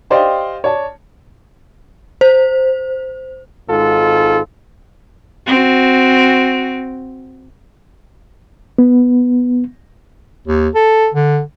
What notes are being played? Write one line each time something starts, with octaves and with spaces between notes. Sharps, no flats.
G4 C5 D5 D#5 F5 G5
C#5 D5 A5
C5
G#1 G#2 F4 A4
C4 F#4
B3
D#2
A4
D3